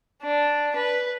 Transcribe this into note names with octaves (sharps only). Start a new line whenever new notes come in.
D4
B4